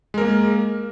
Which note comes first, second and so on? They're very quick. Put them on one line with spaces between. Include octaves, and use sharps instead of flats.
G#3 A#4 A#3